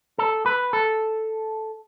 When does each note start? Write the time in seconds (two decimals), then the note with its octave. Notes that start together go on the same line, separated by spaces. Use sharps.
0.18 A4
0.46 B4
0.73 A4